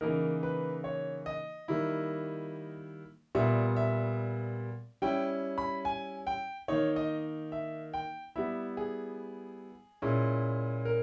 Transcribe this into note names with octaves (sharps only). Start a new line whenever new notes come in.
C#3 E3 A#3 D#4 A#4
B4
C#5
D#5
D#3 G3 A#3 E4
A#2 G3 B3 E5
E5
G3 C#4 E4 G5
B5
G#5
G5
D#3 A#3 D#4 C#5
D#5
E5
G5
G3 B3 E4 E5
G#4
A#2 G#3 C#4 E4
A#4